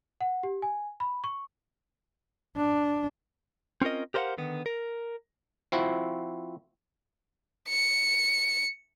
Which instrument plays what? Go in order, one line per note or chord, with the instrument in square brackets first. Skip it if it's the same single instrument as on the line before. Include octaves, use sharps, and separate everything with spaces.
[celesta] F#5
G4
G#5
B5
C#6
[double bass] D4
[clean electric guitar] C4 C#4 F4 A#4 D#5
G4 A#4 C5 D5 F5 F#5
D3 D#3 B3
A#4
[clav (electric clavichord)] F3 C4 E4 F#4
[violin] C#7